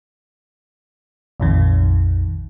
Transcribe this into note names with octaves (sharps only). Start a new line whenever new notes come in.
A#1 F2 D#3